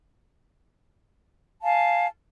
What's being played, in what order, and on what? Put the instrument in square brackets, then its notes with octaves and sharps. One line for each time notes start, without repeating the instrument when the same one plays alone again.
[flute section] F5 G#5 A5